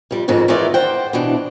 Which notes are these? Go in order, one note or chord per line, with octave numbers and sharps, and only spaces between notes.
F2 G3
F2 G#2 D#3 F#4
D#3 E3 G#3 E4 F4 D5
C5 F#5 G5
B2 E3 D4